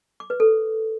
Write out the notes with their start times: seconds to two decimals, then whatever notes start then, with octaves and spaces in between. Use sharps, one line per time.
0.20 D6
0.30 B4
0.40 A4